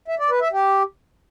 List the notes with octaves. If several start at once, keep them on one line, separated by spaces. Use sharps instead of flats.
E5
D5
B4
E5
G4